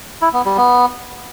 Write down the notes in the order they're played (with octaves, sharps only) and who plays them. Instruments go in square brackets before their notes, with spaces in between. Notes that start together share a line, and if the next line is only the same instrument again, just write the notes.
[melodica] E4
B3
G3
B3